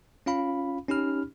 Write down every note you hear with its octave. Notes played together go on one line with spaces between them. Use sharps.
C#4 F4 F5 B5
C#4 D#4 G4 B5 F6